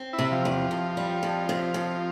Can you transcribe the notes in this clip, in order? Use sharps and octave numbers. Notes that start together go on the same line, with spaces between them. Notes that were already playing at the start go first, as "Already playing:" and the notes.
Already playing: C4
E4
C3
F3
E2
F3
F2
G3
F2
C3
F2